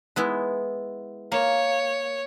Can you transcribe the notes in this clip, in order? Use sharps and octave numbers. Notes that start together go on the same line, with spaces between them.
G#3 B3 E4
A#3 C#5